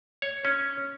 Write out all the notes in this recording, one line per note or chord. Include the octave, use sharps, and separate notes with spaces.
C#5
C#4